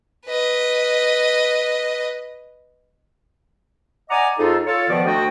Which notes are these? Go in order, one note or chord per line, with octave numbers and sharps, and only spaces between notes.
B4 D#5
D5 D#5 F#5 G#5 A#5 D6
F2 D#4 F4 G#4 A4
F4 A4 C#5
B2 D#3 F3 B3 D5
D2 A3 D4 F#4 D#5 G5